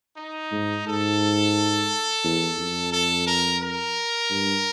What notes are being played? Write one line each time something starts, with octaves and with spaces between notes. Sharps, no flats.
D#4
G#2
G#2 A4
E2
F2
A4
A#4
A#4
G2